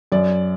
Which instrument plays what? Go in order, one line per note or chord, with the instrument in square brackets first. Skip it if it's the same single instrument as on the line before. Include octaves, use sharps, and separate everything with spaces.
[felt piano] F#2 D5